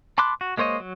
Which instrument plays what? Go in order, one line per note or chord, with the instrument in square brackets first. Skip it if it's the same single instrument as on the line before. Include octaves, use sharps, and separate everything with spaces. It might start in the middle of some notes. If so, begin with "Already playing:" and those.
[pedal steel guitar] A5 B5 C6 D6 F#6
F#4
G#3 A#3 C5 C#5 D#5
F#3